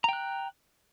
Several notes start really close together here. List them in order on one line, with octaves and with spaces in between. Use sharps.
A#5 G5 F#6